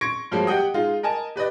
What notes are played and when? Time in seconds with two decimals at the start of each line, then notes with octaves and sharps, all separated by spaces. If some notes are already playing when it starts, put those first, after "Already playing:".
0.01 C6 C#6 G#6 A#6 D7
0.32 G2 F3 F#3 G#3 A#3
0.47 G4 D#5 F#5 G5 D#6
0.74 G#3 D#4 F4 G#4
1.03 A#4 D#5 G#5 A5
1.36 G4 B4 D5 D#5